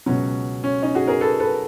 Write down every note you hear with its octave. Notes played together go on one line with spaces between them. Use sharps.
C#2 B2 F#3 C#4
C#4
C#4 D#4
F#4 G#4
G#4 A#4
A4 B4
A4 B4